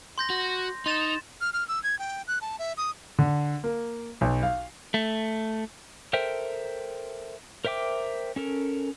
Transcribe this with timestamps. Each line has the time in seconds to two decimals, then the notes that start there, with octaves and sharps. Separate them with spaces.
0.18 C6 G6 A#6
0.30 F#4
0.86 D#4 C6 A6 E7
1.41 F6
1.53 F6
1.68 E6
1.84 G#6
1.99 G5
2.28 F#6
2.41 A5
2.59 E5
2.77 D#6
3.19 D3
3.64 A#3
4.21 B1
4.43 F5
4.94 A3
6.13 A4 A#4 C5 E5 G5
7.65 A#4 C5 E5 G5 D6
8.36 C#4 A4 A#4